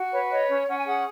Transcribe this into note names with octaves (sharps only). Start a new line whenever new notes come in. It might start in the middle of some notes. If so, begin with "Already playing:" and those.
Already playing: F#4
B4 C#5
C#5 D#5
C#4
C#4 F#5
G#5
G#4 F#5